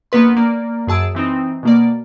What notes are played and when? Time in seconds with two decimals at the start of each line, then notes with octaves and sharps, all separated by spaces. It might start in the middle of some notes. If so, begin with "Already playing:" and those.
0.12 A#1 A#3 B3 B4 C6
0.36 A#3 D5
0.87 F#2 G#4 A5 E6 D7
1.15 E3 C4 D#4
1.63 B2 A#3 D5